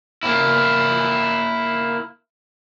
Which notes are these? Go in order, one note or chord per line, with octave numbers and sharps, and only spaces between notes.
A#3 E4